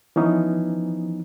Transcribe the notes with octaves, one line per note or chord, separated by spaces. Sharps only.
E3 F3 B3 C#4 D#4